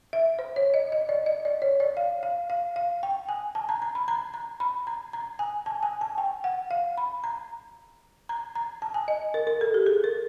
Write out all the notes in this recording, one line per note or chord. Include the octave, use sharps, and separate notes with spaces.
E5
C5
C#5
D#5
D#5
D5
D#5
D5
C#5
D5
F5
F5
F5
F5
G5
G#5
A5
A#5
A#5
B5
A#5
A#5
B5
A#5
A#5
G#5
A5
G#5
A5
G5
F#5
F5
B5
A#5
A#5
A#5
A5
G#5
D#5
A#4
A#4
A4
G4
G#4
A#4